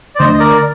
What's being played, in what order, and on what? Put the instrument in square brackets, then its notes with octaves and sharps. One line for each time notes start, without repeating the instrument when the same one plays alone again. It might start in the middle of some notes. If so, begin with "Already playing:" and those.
[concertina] D5
[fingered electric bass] D3 A3 D4 [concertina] C5 D#5
[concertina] D#5
A#4 D5